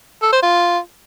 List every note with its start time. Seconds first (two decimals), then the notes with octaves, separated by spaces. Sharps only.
0.22 A4
0.32 C5
0.43 F4